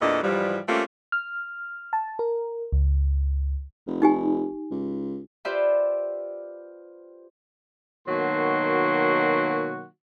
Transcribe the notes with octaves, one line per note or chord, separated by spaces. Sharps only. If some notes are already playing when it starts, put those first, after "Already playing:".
E2 A#2 E3 A3 D4 D#5
G#2 E3 F3 G3
G3 A3 A#3 C4 C#4 F4
F6
A5
A#4
C#2
F1
D#4 G4 G#5
C#2
F4 G4 B4 C5 D5 E5
B2 D#3 F#3 A#3 F#4 C6